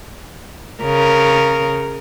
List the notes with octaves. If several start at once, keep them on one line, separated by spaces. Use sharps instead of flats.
C#3 A#4